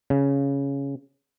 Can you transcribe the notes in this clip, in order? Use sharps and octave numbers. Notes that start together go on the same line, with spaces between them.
C#3